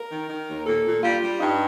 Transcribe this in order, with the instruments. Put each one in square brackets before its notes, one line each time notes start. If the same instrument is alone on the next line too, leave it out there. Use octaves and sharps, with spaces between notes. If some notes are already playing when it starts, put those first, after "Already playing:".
Already playing: [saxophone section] A#4
D#3
D#3
D#2
A#2 A4
A#2
G3 F4
G3
G2 D#4